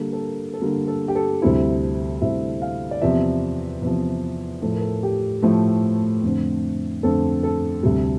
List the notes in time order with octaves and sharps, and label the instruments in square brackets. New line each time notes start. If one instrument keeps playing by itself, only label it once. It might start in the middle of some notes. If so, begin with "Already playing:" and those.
Already playing: [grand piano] D3 G3 A#3 A4
A4
A#4
A4
D3 G3 A#3 A#4
A4
G4
A4
D2 C3 G3 C4 E4
D2 C3 G3 C4 E4 E5
F5
D5
E2 C3 F3 E5
E2 C3 F3
A2 F3 A3 A4
A#4
A4
G4
A2 F3 A3
F2 D3 A3 C4
F2 D3 A3 C4 A4
A4
D2 C3 G3